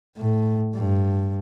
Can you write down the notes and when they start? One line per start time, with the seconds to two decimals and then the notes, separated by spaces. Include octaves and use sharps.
0.17 A2
0.75 G2